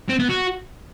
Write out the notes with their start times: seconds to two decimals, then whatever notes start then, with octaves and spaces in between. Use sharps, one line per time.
0.09 C4
0.19 B3
0.29 F#4